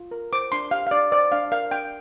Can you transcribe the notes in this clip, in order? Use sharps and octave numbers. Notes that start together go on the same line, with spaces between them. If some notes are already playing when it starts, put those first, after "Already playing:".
Already playing: F4
A#4
C5 D6
D4 C6
G4 F5
F5
D4 D5
C5 D5
D4 F5
A#4 F5
D4 G5